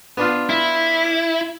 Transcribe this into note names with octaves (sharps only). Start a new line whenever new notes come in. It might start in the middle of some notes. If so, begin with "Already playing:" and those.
B3 D4 F4
E4